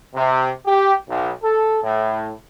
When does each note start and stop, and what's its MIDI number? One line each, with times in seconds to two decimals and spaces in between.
0.15 0.50 48
0.66 0.92 67
1.09 1.31 35
1.43 1.78 69
1.82 2.31 45